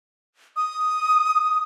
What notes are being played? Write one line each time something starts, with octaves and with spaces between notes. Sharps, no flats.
D#6